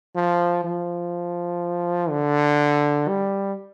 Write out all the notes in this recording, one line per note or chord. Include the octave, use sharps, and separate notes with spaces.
F3
F3
D3
G3